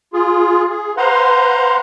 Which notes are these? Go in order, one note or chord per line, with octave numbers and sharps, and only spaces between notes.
F4 G#4
G#4
B4 C5 F5 F#5 A#5 C6